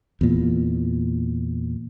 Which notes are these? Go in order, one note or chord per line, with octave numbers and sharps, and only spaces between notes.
E2 A#2